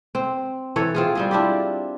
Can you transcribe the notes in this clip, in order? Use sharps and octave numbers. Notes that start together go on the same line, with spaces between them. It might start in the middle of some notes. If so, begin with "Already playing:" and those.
C4
E3 A4 C#5
C4 F4 G#4
G3 C4 G#4
D4 E4 F4 G4